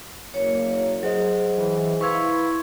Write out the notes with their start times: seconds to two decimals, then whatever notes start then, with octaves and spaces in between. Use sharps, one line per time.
0.34 F#1 A#3 C#5
1.03 F#3 G#4 C5 D#5
1.57 E3
2.01 E4 B4 F5 C6 C#6 E6 G#6